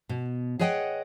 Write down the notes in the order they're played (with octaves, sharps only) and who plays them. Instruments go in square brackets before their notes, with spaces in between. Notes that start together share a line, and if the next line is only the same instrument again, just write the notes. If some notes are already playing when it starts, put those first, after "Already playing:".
[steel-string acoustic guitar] B2
G#4 B4 C#5 D#5 F#5 G5